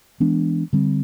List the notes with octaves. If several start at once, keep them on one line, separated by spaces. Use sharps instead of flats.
E3 G#3 B3 D4
D3 G3 C4